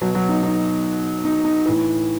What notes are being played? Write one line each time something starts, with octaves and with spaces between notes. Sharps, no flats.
B2 F#3
F#3
D#4
D#4
D#4
D#4
A2 E3